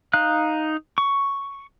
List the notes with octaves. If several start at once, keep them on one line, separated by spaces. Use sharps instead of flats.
D#4 F5 F#6
C#6